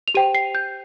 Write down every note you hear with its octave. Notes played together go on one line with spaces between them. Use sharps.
F7
G4 C5 G5 D#7
C7
G6